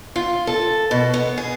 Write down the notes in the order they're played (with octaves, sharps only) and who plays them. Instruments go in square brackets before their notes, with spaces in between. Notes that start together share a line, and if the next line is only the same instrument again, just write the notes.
[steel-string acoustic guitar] F4
A4
B2
B3
G#4